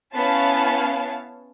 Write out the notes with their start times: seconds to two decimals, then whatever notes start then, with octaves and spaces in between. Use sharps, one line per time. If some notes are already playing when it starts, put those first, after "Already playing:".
0.15 B3 C#4 E4 C#5 F5 A5